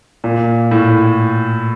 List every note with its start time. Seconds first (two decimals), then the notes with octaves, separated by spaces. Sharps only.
0.24 A#2
0.71 A2